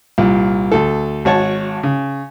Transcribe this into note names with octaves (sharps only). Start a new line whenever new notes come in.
C2 A#2
D2 A4
G#1 F#4 C#5 A5
C#3